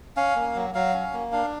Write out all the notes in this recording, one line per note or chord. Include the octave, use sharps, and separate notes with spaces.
C#4 F5
A#3
F#3
F#3 F5
C#4
A#3
D4 F5